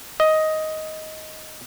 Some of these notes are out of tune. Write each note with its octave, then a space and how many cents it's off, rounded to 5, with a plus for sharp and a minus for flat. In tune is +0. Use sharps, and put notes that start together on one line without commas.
D#5 +10